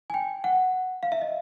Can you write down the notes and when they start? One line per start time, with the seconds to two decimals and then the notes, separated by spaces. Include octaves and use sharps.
0.10 G#5
0.14 G5
0.44 F#5
1.03 F5
1.12 E5
1.22 D#5